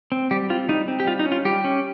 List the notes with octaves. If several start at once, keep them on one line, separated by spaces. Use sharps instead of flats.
C4
G3 G4
C4 F4
G3 D#4
C4
G4
G3 F4
D#4
C#4
F4
G3 G4
C#4